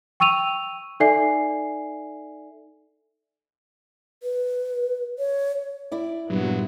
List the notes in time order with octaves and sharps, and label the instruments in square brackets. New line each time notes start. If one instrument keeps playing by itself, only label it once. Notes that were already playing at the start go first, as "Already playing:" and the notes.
[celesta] G5 C#6 E6 D#7 F7
D#4 A4 D5 E5 G#5 C7
[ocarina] B4
C#5
[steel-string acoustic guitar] E4 D5
[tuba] G2 [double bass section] A#2 B3 [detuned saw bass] F#3